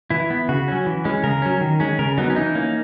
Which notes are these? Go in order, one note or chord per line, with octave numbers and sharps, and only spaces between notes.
E3 E4
B3
C#3 F#4
F#3 C#4
E3
G#3 C#4
C#3 A#4
F#3 C#4
D#3
G#3 C#4
C#3 A#4
F#3 B3 D#4
C#4
E3 D#4
A#3 C#4